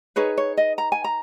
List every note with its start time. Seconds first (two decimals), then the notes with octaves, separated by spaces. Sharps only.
0.16 D#4 G#4 B4 C#5
0.37 C#5
0.57 D#5
0.78 A#5
0.92 G#5
1.04 A#5